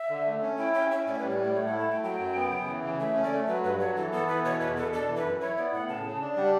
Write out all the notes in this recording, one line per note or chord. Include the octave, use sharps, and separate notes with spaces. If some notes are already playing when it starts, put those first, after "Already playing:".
Already playing: E5
D3
A3
C#4
E4 G5
C#4 G5
C#4 E5
A2 D5
C#5
B4
G3
C#5
A2 D5
A3 C#5
F#5
E4
A5
A3 G5
F#3 G5
F#2
B3
C#3
E3
C#3
A3 E5
C#4
D5
A3
F#3 B4
G2 B4
F#3 C#5
E3 A4
B3 A4
E3 B4
B2 C#5
E2 B4
B2 A4
D4 A4
E3
B4
F#2
E4 C#5
B3 D5
A2 F#5
C#3 A5
C#3
D4
G3 F#5